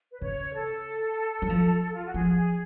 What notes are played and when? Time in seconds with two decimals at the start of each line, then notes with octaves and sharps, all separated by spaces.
0.11 B4
0.21 C#3 C#5
0.53 A4
1.42 F#3
1.50 F3
1.96 F4
2.06 F#4
2.14 F3 G#4
2.37 G#4